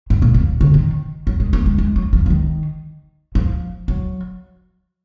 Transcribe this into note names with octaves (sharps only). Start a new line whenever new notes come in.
G#2
A#2
B2
C#3
D#3
F#3
G#3
A#3
G#3
G#3
F#3
F3
F3
D#3
F3
F#3